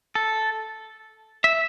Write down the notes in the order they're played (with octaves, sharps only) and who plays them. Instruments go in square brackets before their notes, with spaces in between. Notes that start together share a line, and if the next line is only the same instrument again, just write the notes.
[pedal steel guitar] A4
E5